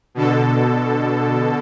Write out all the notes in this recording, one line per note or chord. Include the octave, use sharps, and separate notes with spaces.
B2 D3 A4